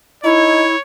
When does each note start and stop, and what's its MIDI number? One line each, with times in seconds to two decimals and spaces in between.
0.24 0.64 63
0.24 0.75 64
0.24 0.81 73